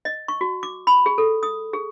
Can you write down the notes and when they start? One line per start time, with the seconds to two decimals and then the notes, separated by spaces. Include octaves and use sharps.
0.05 D#5
0.28 C#6
0.41 F#4
0.63 D6
0.87 B5
1.06 G#4
1.18 A4
1.43 D#6
1.73 G#4